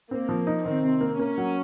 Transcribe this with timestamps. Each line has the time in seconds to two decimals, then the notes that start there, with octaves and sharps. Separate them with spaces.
0.11 A#3 C4
0.29 F3
0.47 D#4
0.65 D#3 C4
0.83 C3
1.01 A#3
1.19 A#3 C#4
1.38 F#3